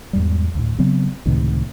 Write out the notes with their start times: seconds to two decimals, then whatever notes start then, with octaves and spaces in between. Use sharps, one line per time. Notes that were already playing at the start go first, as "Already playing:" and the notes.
0.13 E2 G#2 G3
0.55 D2 A2
0.79 C#3 F#3 B3 C4
1.26 C#2 A2 C3 D#3